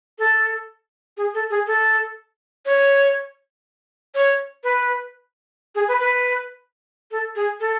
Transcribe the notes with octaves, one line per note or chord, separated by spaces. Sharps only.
A4
G#4
A4
G#4
A4
C#5
C#5
B4
G#4
B4
B4
A4
G#4
A4